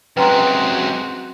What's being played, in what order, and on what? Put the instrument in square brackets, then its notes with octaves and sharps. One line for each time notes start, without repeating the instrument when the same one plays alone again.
[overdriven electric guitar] F#2 G#3 [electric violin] C4 F#4 [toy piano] B4 A#5 [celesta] G5 C6